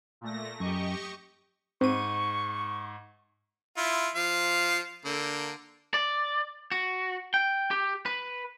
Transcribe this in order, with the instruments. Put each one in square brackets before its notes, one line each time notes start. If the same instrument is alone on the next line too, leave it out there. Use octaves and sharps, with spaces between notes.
[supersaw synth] A#2 A3 A#6
[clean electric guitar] F#2 [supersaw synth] G4 D#5 C#6
[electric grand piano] G#2 [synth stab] C4 D#7 [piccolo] C#6
[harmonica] E4 F4
F3 F5
D3 A#3
[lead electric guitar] D5
F#4
G5
G4
B4